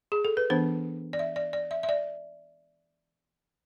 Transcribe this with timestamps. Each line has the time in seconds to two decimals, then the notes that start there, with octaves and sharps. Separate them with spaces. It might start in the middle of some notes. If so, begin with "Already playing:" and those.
0.12 G#4
0.25 A4
0.37 B4
0.50 E3 B3 D4 C5
1.13 D5
1.19 E5
1.36 D5
1.53 D5
1.71 E5
1.83 E5
1.89 D5